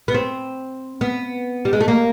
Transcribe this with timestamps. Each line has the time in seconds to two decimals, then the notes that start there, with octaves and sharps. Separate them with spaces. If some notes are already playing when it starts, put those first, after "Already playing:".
0.08 B3
0.14 C4
1.01 B3
1.65 G3
1.73 G#3
1.80 A3
1.88 A#3